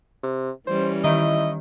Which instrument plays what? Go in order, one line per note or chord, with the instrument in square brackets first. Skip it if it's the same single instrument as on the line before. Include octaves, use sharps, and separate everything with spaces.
[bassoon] C3
[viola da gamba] E3 G3 C#4 [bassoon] C5
[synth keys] D#3 [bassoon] E4 [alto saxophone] D#5